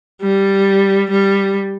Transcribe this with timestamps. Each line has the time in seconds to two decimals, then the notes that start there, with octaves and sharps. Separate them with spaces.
0.22 G3
1.10 G3